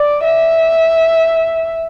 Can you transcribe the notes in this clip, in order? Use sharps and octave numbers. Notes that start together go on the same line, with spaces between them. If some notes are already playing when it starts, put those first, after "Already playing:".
Already playing: D5
E5